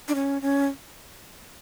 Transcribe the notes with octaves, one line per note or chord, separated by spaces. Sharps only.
D4
C#4
C#4